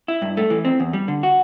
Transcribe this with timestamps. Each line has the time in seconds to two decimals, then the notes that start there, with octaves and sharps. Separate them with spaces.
0.08 E4
0.22 G2
0.37 A3
0.50 E3
0.65 C4
0.80 E2
0.93 G3
1.08 D3
1.23 F#4